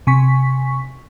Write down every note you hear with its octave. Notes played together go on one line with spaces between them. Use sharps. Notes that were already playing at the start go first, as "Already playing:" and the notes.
C3 G#5 C#6 B6